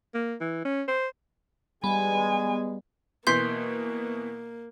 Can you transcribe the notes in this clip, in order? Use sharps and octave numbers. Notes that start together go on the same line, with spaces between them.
A#3
E3
C#4
C5
G3 G#3 B3 G#5
B2 E3 A#3 C6 G6 B6